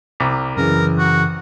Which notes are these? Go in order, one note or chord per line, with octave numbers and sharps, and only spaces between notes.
C2 A#5 D6 B6
F#2 C#3 E3 A#4
F#4